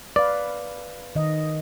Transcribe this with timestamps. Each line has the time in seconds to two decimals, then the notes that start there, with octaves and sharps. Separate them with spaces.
0.16 B4 D5 F5
1.15 D#3 D#5